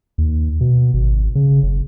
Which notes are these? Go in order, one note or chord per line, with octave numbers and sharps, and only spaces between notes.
D#2
B2
G#1
C#3
F#1